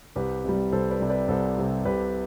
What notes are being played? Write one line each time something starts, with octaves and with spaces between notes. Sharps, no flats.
C2 G4 B4
C3 G3
C2 A4 C5
B4 D5
C3 G3
B4 D5
C2 A4 C5
C3 G3
C2 G4 B4